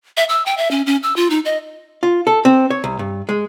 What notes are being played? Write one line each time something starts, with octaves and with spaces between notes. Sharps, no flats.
E5
E6
G5
E5
C#4
C#4
E6
F4
D#4
D#5
F4
A4
C4
C#5
C2
G2
G#3